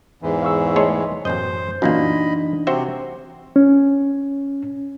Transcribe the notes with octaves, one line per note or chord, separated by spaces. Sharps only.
E2 G#2 E3
F5 C#6 E6
A3 G#4 A4 C#5 D#5 C6
A1 F#2 B2 C5 D#5
F#2 A#2 E3 A#3 D4 D#4 D#5 B5
C3 C4 F#4 C5 E5
C#4